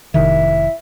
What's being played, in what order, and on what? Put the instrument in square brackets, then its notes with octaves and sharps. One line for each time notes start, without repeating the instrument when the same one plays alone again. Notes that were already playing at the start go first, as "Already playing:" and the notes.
[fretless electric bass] F1 C3 D#3 [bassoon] E4